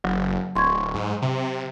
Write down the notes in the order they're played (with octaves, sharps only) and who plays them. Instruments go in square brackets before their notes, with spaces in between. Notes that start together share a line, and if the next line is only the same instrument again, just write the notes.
[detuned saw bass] F#1 [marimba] F#3
[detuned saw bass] D1 [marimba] C6 C#6 G#6
[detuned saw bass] G#2
C3